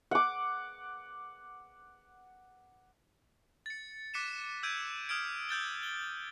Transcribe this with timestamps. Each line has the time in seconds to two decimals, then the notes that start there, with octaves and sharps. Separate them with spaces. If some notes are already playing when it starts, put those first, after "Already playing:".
0.11 F#5 D6
3.66 A6 C#7
4.14 D6 F#6 B6 C#7 D#7 E7
4.63 E6 G6 G#6 D7 D#7
5.09 D#6 F6 G#6 D7
5.49 E6 G6 A6 G7
5.83 G7